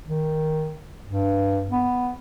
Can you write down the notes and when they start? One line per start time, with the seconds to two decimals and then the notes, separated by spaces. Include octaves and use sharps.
0.07 D#3
1.06 G2
1.71 B3